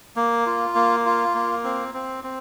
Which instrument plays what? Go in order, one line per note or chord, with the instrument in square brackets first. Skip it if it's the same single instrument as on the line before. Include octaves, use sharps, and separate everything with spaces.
[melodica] A#3
F4
A#3
F4
A#3
C4
C4
C4